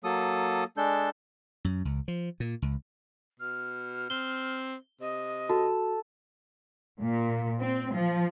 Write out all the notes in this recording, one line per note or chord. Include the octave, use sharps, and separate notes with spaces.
F#3 A#3 A4 D#6
G#3 D4 A4 G6
F#2
C#2
F3
A#2
C#2
B2 F6
C4 G7
C3 D#5
F#4 A4
A#2
C4
F3